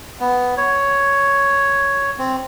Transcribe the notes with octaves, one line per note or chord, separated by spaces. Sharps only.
B3
C#5
C4